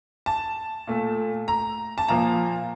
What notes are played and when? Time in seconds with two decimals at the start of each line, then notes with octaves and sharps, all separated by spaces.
0.26 A5
0.87 A#2 A3
1.48 A#5
1.98 A5
2.08 A#2 F3 A#3 A#5